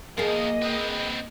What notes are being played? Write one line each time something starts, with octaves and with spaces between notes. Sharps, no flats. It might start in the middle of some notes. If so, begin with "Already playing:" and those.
D#2 F3 A#3 G#4 A#4 D#5
C4 B4